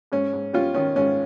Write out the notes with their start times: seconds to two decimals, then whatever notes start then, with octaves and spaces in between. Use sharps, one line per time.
0.12 G#2 C#4
0.33 G#2
0.53 G3 C#4 F4
0.74 D#3 C#4
0.96 G#2 C#4